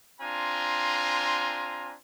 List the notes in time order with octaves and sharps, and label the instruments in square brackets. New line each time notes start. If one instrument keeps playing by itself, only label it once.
[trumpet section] C4 D4 F4 G#5 A#5 C6